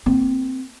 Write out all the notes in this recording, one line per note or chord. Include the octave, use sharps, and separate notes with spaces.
A#3 C4